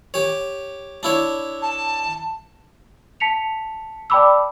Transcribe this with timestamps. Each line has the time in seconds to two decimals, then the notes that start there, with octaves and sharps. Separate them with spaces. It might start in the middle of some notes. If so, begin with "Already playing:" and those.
0.14 G4 C#5
1.03 D4 E4 C#5
1.62 A5
3.20 A5 B6 C#7 F7
4.10 D5 G5 A5 B5 D6 E6